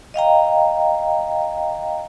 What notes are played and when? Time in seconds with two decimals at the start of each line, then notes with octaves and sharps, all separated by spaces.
0.14 D#5 F5 G5 A#5